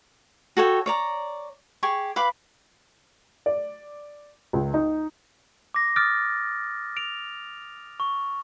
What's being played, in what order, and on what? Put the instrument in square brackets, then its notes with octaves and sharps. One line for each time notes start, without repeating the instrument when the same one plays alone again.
[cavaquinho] F#4 A4 C#5 G5
C#5 D5 A#5
G4 G#4 C#6
B4 F5 B5 D6
[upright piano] D5
C#2
D#4
[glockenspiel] D6 A#6
D6 D#6 F6 F#6 A6 D7
D7 F7
C#6